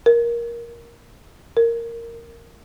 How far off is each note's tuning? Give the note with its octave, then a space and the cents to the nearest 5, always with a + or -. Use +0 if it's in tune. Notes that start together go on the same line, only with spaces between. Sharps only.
A#4 +10
A#4 -10